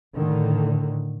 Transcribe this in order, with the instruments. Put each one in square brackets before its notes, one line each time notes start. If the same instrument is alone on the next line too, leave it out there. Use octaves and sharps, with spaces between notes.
[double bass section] A2 D3 D#3